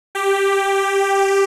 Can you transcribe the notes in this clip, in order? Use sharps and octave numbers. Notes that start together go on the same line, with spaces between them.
G4